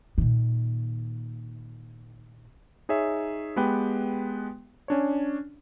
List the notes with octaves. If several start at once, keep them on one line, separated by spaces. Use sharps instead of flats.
A#2 D#3
D#4 G#4 C#5 E5
G#3 B3 G4 B4 G5
C#4 D4 C#5